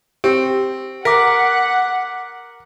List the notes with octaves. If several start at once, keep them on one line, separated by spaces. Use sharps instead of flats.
C4 G4
A#4 F#5 D6 B6